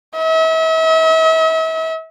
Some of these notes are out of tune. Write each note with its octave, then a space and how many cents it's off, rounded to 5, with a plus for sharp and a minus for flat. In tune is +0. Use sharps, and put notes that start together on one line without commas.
E5 -40